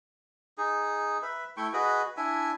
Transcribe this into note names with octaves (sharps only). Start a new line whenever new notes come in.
D#4 G#4
B4 E5
A3 E4 G5 C#6
F#4 G#4 B4 D#5
D4 E4 E5 G#5